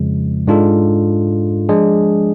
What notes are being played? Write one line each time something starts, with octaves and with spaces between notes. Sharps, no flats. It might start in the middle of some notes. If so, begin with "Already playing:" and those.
Already playing: F2 C#3 F3 G#3
G#2 G#3 D4 F4 A4
F3 G#3 D4 G#4